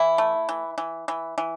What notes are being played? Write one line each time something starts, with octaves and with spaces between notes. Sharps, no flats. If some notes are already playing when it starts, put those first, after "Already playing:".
Already playing: E3 E4
A3
E3
E3
E3
E3